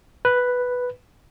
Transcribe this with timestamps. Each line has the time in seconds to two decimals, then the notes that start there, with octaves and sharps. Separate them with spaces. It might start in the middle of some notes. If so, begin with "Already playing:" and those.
0.25 B4